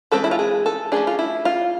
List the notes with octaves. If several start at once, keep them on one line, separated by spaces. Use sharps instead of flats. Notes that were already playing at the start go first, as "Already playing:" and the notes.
E3 G#3 C4 A4
E4
F4
G#4
A4
F3 A3 D4 G#4
F4
E4
F4